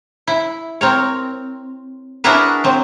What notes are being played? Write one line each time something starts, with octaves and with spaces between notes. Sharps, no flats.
E4
C4 A#4 C#5
D4 E4 F#4 G#4 A#4 B4
F#3 C4